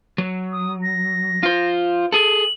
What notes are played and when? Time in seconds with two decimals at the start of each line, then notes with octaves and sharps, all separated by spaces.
0.18 F#3
0.52 D#6
0.83 A#6
1.43 F4 C5
2.12 G#4 A4 F#7